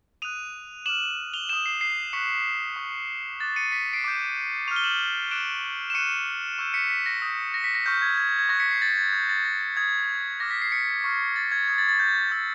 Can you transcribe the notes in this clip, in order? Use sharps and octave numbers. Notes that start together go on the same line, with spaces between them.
D#6 F#6 D#7 F7
D6 F6 E7 F#7
F7 G7
D#6 G6 E7 F#7
C7
C7
C#6 F#6 B6 C#7
C#6 F#6
D6 F#6 A6
C#7 D#7
B6 C#7
C7 D7
D6 G6
C#6 F6 D#7 F7
G7
E7 F#7
D6 F#6 D7 E7
E7
C#6 F#6 C#7 D#7
C#6 E6 G6
B6 C#7
B6
A#6
D#6 G6
A#6
B6
A#6
C#6 F6 G6
G#6
G#6
G6
G#6
C#6 F#6 A#6
B6 C#7
C7
A6
G#6
C#6 F6 G6
A6
A#6
A6
D#6 G6 G#6
D6 F6 A#6
B6
C7
B6 C#7
C#6 F6
A6
G#6
D#6 G6 G#6
A6
A6
G6
C#6 E6 G6